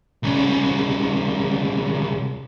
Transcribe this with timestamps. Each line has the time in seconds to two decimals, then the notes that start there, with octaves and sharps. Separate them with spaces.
0.23 C2 C#3